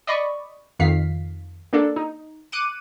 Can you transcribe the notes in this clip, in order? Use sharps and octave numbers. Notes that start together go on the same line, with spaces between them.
D5 D#5 B5 C#6
F2 D#3 F5 B6 C7
A#3 D4 A4
D#4
D6 F#6 C#7 D#7